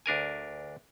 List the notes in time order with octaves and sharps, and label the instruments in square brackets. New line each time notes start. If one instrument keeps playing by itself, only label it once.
[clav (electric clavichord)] D2 D4 A#4 G#5